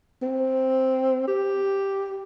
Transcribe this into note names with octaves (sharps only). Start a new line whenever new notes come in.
C4
G4